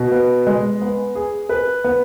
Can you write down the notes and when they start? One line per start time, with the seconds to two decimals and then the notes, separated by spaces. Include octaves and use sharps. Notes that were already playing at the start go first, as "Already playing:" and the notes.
Already playing: B2
0.12 B3
0.47 G#3
0.82 B3
1.15 G#4
1.49 B4
1.84 B3